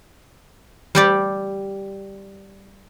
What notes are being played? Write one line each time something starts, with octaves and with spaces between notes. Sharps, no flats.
G3 G4 D5